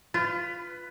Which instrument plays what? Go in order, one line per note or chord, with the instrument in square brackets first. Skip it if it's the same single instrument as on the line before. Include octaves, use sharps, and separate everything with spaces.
[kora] F4 [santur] B4